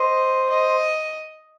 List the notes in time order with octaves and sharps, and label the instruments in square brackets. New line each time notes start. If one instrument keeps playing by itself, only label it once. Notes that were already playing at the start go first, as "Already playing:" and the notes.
Already playing: [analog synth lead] C5 [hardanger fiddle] D#5
[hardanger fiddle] D#5